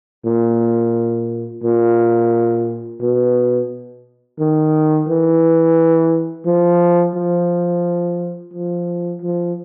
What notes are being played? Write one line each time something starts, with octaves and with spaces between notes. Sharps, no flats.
A#2
A#2
B2
D#3
E3
F3
F3
F3
F3